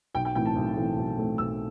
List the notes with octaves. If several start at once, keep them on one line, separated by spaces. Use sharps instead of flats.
B1 G5
G5
A2 E3 A3 C4 G5
A5
B1
A2 E3 A3 C4
B1
A2 E3 A3 C4
B1 E6